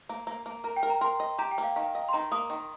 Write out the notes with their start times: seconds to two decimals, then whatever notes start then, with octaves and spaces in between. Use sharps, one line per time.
0.09 A#3
0.27 A#3
0.46 A#3
0.64 A#4 A#5
0.76 G5
0.83 A#4
0.90 A#5
1.01 A#4 C6
1.20 D#5
1.39 G4 A#5
1.51 G5
1.58 A#3
1.63 F5
1.76 D#3 F5
1.94 D#5 F5
2.09 C6
2.13 D#3 A#5
2.32 A#3 D#6
2.50 D#3